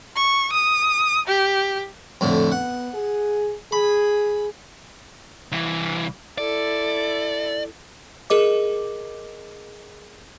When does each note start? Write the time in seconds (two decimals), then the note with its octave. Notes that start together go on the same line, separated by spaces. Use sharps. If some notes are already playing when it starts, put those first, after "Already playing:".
0.16 C#6
0.52 D#6
1.28 G4
2.21 F2 A2 D3
2.52 B3 F#5
2.94 G#4
3.72 G#4 B5
5.52 C2 E3
6.38 E4 A4 D5
8.30 G#4 A#4 D#5 D6